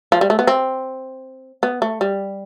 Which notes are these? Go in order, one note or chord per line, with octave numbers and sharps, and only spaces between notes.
F3
G3
A3
B3
C4
B3
A3
G3